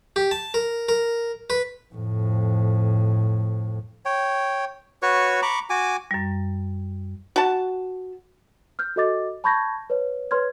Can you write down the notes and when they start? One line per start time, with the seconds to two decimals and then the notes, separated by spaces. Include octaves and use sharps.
0.16 G4
0.31 A5
0.54 A#4
0.89 A#4
1.50 B4
1.94 F2 A2
4.05 C#5 G5
5.02 F#4 B4 C#5 C#6
5.42 A#5 B5 C#6 D6
5.70 F#4 G#5 D6
6.11 F#2 G3
7.36 F#4 A5
8.79 F6 G6
8.96 F#4 A4 D#5 D6 A6
9.44 A5 B5 C#6 G6 G#6 A#6
9.90 B4 C#5
10.31 B4 C#5 C6 F6 G#6